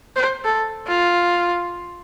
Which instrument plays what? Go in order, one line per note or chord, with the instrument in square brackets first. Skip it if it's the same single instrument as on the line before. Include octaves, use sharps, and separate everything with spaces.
[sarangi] C5
A4
F4